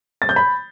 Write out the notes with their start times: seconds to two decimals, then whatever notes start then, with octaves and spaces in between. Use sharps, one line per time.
0.22 A6
0.29 G6
0.36 B5